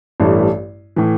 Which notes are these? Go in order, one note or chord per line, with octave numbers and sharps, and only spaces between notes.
A1 G2 E3 A3
A2 E3